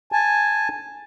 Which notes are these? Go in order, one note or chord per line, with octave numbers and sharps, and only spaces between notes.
G#5 A5